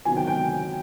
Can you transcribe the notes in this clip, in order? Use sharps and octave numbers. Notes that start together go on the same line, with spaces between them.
C3 D#3 F#3 G#5
G5
G5